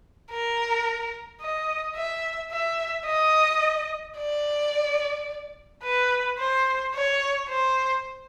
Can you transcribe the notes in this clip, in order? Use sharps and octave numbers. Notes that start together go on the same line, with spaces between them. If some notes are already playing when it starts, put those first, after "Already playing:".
A#4
D#5
E5
E5
D#5
D5
B4
C5
C#5
C5